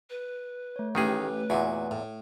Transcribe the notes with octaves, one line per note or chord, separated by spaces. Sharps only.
B4
A3 C#5
A1 A2 D#3 D#4 G4 G#4 B4
E2 A#2 E4 F#4
A2